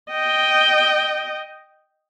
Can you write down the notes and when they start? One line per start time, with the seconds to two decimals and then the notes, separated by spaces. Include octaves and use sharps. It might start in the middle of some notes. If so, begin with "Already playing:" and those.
0.11 D#5 G5